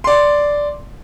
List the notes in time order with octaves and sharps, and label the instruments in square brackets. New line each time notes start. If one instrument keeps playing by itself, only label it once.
[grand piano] D5 C6